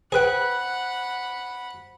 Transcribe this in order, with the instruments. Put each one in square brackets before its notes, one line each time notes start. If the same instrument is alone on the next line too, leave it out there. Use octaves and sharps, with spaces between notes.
[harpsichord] G#4 B4 G5 [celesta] C5 F#6 [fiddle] F#5 B5